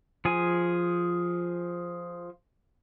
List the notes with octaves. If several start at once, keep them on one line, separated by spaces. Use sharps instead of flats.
F3 G#4 G#5